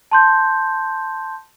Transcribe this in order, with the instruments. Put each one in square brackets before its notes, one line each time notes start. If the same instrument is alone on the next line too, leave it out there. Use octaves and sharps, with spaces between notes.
[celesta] A5 C6 G6